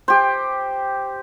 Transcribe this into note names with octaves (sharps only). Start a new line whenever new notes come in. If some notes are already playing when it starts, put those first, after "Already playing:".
G4 C5